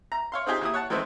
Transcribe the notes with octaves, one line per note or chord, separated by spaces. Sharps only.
A#5
C#5 F5 C6
C4 D#4 F4 G4 G#4
D#2 E4 D#6
C#5 F#5 A5
D#3 E3 G#3 A3 C4 E4